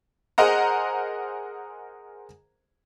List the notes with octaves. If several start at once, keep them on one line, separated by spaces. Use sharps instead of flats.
G#4 A#4 C5 D#5 F#5 A#5